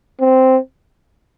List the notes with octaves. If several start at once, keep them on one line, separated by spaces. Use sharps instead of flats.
C4